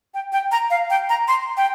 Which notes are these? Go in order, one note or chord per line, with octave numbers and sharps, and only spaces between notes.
G5
G5
A#5
F5
G5
A#5
C6
G5